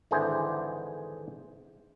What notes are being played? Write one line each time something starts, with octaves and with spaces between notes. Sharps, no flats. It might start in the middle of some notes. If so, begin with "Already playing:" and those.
G#1 D3 E3 D4 G#4 C5